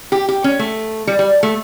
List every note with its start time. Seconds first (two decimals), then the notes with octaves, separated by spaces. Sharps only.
0.12 G4
0.29 G4
0.44 C#4
0.59 A3
1.07 G3
1.19 G3
1.43 A3